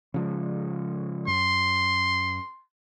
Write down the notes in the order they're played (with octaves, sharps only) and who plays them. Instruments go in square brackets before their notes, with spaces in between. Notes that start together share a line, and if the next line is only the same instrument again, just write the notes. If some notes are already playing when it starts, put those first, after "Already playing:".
[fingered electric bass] C#3 F3 G#3
[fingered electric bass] F#2 [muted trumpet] C6